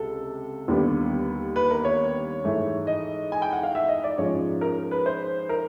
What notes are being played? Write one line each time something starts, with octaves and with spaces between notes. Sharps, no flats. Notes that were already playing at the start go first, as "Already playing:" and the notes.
Already playing: C#2 C3 A4
D#2 D3 G3 B3
B4
A#4
C#5
G#2 E3 A3
D#5
G#5
G5
F#5
F5
E5
D#5
D5
G#2 F3 G#3 C#4 C#5
A#4
B4
C5
A#4